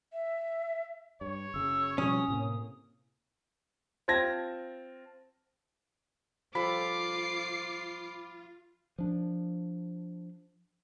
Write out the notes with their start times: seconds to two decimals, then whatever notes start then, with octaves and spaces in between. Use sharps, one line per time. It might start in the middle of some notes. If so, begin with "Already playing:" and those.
0.13 E5
1.21 G2 C#5
1.54 F#1 C#3 E6
1.98 B2 F3 G3 C#4 D#6
2.28 A2 C3 A#3
4.08 C4 F4 A5 G#6 A#6
6.55 F3 G3 F4 A4 B5 D6 C7
8.98 F3 D4